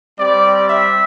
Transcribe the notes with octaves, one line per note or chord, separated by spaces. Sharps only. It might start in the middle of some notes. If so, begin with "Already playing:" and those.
G3 C4 G4 D5
E5